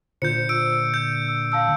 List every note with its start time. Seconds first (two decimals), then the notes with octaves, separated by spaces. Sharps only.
0.22 A#2 D3 F4 C5 G6 C#7
0.49 E6 D7
0.94 G6
1.28 E6
1.52 F5 A5 E6